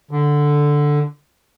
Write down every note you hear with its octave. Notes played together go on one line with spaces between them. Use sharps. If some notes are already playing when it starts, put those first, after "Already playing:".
D3